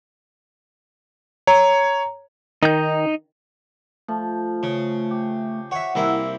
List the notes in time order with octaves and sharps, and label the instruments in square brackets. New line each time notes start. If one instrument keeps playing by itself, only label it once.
[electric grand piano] C#5 [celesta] A#5
[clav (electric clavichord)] D#3 [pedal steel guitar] D#4 G6
[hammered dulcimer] F3 [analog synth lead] A3
[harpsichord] C#3
[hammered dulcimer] G4
[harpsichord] C#5 E5 [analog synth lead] F#5
[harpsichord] C2 A#3 E4 [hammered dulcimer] C4